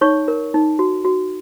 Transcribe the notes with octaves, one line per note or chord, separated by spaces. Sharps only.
D#4 C#5 C#6
A#4
D#4
F#4
F#4